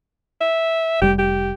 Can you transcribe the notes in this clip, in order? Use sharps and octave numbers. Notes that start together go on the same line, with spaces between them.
E5
F1 G3 G4
G4